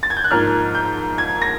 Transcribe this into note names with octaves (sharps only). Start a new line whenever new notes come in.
A6
G#6
G6
F#6
G#2 F3 A#3 F6
G6
G#6
A#6